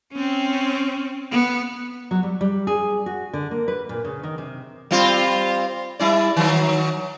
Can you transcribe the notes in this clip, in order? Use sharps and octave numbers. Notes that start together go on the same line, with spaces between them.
C4 C#4
B3
F#3
G3
G3
G#4
F#4
D3
A#3
B4
A#2
C#3
D#3
C3
G3 C4 F4
G3 E4 D5
D#3 F#3